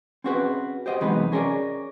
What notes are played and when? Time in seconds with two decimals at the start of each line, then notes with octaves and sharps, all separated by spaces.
0.24 C4 C#4 F#4 G#4 B4
0.86 G4 C5 D#5 F#5
1.01 E2 C3 F#3 G#3 D#4 B4
1.32 C#4 G#4 A#4 C#5 D5 G#5